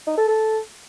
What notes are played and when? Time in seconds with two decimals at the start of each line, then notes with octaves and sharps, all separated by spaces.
0.07 D#4
0.18 A4
0.28 A4